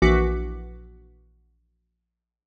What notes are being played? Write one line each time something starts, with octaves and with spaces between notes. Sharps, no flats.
A#1 E3 F#4 D6 B6 C#7